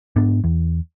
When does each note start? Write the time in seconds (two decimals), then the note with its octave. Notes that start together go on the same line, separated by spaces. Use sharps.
0.16 G#2 B3 D4
0.44 E2